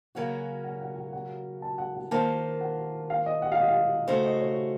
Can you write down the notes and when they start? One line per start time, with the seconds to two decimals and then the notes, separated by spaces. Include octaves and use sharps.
0.15 C#3 F#3 A#3 C#4 F#4 F#5
0.64 F#5
0.81 F#5
0.96 F#5
1.13 F#5
1.62 A5
1.78 F#5
1.95 F#5
2.11 D#3 A#3 F4 C5 A5
2.61 F#5
3.10 F5
3.26 D#5
3.42 F#5
3.52 F5
3.59 D#5
3.68 F5
4.07 C#3 A3 D#4 F#4 C5
4.25 D#5
4.41 C#5